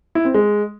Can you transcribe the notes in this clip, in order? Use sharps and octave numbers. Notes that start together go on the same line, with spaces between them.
E4
C4
G#3